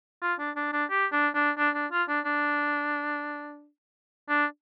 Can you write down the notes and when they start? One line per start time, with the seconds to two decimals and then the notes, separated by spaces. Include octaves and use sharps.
0.22 F4
0.39 D4
0.56 D4
0.73 D4
0.90 G4
1.12 D4
1.35 D4
1.58 D4
1.75 D4
1.91 F4
2.08 D4
2.26 D4
4.29 D4